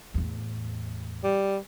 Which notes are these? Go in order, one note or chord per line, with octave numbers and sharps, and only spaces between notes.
E2 A2
G3